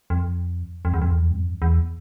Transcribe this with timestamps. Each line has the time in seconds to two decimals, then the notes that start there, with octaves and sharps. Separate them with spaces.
0.10 F2
0.85 F2
0.94 E2
1.02 F2
1.11 E2
1.31 G2
1.36 F2
1.62 E2